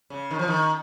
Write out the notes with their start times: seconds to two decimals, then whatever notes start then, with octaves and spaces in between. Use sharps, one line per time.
0.10 C#3
0.31 D#3
0.39 F3
0.48 D#3